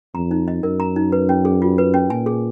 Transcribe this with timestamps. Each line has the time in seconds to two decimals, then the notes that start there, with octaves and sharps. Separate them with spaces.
0.14 F2 A#5
0.31 D#4
0.48 D#5
0.63 F#2 A#4
0.80 A#5
0.96 D#4
1.12 B4
1.29 C#4
1.45 G#4
1.62 F4
1.78 B4
1.94 C#4
2.10 A#2 G#5
2.26 G#4